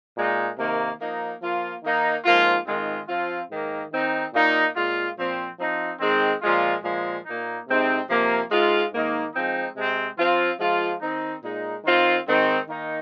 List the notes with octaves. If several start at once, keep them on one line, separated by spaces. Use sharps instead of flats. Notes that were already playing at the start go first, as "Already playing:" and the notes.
A#2 G#3 D#4
C3 D#3 A#3
F3 A#3 D#4
F3 A#3 F4
D#3 A#3 D#4
G#2 F3 A#3 F4
G#2 D#3 G#3 C4 F4
F3 C4 F4
G#2 D#3 A#3
D#3 C4 D#4
A#2 A#3 D#4
A#2 G#3 F4
A#2 F3 C4
F3 C4 D#4
D#3 G#3 C4
A#2 F3 G#3 F4
A#2 F3 G#3
A#2 A#3 D#4
C3 G#3 C4 D#4
C3 F3 A#3
G#2 G#3 F4
G#2 D#3 A#3 D#4
F3 G#3 C4 D#4
C3 G#3 C4
F3 C4 F4
F3 G#3 F4
D#3 C4 D#4
A#2 G#3 D#4
D#3 C4 F4
G#2 D#3 C4 D#4
D#3 A#3 D#4